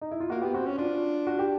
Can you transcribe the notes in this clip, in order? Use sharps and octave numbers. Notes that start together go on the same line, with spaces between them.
D#4
E4
F4
A#3 F#4
B3 G4
C4 F#4
C#4
D4 F4
F#4
G4